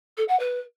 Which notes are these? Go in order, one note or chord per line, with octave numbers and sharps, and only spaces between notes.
A4
F#5
B4